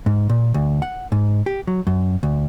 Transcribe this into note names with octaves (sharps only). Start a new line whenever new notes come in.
G#2
A#2
D2
F#5
G#2
G4
F#3
F#2
D2